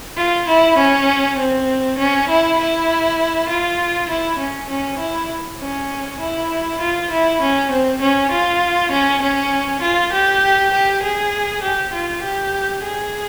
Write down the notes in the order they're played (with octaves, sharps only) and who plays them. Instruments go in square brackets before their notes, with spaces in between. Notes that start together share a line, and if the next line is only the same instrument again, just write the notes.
[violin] F4
E4
C#4
C4
C#4
E4
E4
F4
E4
C#4
C#4
E4
C#4
E4
F4
E4
C#4
C4
C#4
F4
C#4
C#4
F4
G4
G4
G#4
G4
F4
G4
G#4